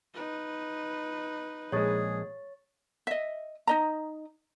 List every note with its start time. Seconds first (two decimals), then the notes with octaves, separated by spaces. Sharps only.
0.14 D#4 B4
1.72 A#1 G#3 G#4 C#5 C#6 A6
3.07 D#5 E5
3.67 D#4 D#5 A#5